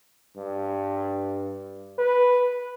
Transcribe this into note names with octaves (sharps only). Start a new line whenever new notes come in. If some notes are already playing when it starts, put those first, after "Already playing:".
G2
B4